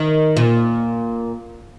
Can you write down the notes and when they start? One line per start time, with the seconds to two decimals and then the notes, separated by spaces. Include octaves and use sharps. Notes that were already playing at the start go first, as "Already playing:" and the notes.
Already playing: D#3
0.37 A#2